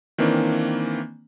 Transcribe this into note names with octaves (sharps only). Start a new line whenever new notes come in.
D#3 E3 A#3 C4 D4